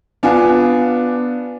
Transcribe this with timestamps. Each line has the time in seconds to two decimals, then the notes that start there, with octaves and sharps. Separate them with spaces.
0.23 B3 D4 F4 G#5